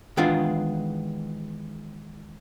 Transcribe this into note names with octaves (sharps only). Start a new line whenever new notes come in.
D#3 E3 G#3 B3 D4 F4